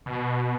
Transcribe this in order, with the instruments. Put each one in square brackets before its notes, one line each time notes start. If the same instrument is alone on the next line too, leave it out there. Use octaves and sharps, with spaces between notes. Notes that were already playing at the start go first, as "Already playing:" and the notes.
[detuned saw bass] B2